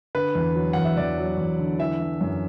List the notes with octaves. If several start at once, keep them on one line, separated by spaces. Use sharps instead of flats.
D3 B4
E2
F#3
E2 F#5
E5
E2 D5
F#3
E2
D3
E3 E5
E3
F#2